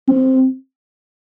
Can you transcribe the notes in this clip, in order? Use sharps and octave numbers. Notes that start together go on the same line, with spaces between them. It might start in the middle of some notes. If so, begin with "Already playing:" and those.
C4